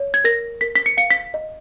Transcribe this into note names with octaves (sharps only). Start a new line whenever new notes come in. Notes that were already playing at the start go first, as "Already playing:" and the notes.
Already playing: C#5
G#6
A#4 A#6
A#4 B6
B6
C#7
F5 C#7
B6
D#5